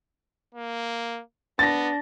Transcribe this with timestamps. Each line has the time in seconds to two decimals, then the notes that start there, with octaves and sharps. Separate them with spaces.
0.55 A#3
1.59 B3 D4 A6 A#6